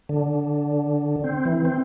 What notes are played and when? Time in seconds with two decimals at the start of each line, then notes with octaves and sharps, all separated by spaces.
0.09 D3
1.24 C4
1.45 E3
1.65 C4